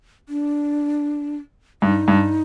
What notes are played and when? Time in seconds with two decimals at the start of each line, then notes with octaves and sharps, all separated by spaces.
0.29 D4
1.82 G2 D#4
2.08 G2